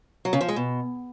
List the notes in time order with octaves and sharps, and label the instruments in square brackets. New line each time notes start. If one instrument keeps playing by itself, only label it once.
[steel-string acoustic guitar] F#3
C#3
F3
G#3
B2